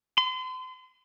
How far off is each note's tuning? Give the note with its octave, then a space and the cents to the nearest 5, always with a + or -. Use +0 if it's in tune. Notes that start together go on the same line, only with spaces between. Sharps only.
C6 -40